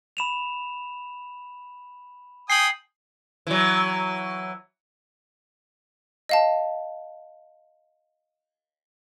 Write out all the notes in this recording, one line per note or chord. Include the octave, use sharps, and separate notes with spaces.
B5 E7 F7
G5 G#5 D#6 C7 F#7
E3 F#3
D#5 F5 A5